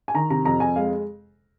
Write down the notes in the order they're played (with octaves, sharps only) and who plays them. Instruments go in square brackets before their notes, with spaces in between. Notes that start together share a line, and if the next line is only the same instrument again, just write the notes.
[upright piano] G#5
D#3 A#5
C3 A#5
F2 A#5
F2 G#5
G#3 F5